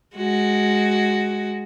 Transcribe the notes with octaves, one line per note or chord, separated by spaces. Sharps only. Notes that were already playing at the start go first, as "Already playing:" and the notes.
G#3 F#4